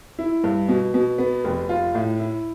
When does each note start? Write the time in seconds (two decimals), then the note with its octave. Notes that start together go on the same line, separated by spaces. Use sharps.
0.19 E4
0.44 G2
0.69 B2
0.94 B2
1.18 B3
1.44 F1
1.69 F4
1.95 A2
2.20 E4